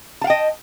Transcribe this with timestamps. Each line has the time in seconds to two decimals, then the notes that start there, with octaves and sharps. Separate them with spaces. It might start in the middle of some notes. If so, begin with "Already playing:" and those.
0.21 A5
0.24 F5
0.27 G5
0.30 D#5